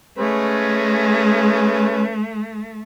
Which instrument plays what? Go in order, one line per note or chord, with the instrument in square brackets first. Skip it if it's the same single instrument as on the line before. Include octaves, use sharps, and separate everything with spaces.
[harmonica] G#3 C#4 B4 [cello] A3